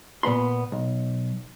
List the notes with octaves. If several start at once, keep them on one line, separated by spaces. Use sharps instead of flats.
A#2 B3 B5 C6
B1